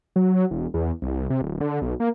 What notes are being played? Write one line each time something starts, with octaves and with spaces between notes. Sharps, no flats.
F#3
E1
E2
C2
C3
D1
D3
B1
A#3